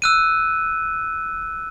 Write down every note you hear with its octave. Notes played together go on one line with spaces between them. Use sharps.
E6 F#6 D#7